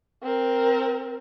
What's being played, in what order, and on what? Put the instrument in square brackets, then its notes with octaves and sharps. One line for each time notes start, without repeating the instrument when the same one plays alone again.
[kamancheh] C4 A#4